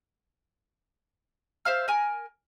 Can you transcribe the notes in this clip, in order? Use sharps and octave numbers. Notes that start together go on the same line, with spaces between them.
C5 E5 F5 F6
A#4 G#5